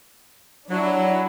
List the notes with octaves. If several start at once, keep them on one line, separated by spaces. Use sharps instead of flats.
F#3 D4 E4